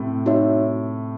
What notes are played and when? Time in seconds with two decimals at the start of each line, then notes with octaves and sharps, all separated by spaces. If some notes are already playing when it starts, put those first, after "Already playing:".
Already playing: A2 C3
0.26 D#4 F#4 C#5 E5